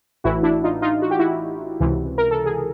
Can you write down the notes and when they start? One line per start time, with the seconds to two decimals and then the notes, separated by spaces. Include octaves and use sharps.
0.24 A1 A2 E3 E4 F#4
0.43 D4 E4
0.64 D#4 F4
0.82 D#4 F4
1.02 F#4
1.11 G4
1.19 E4 F#4
1.80 C#2 C3 E3
2.18 A#4
2.31 A4
2.46 G#4